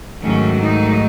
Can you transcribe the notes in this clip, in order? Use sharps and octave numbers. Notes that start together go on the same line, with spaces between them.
G#2 D#3 F#3 A3 C#4
D#4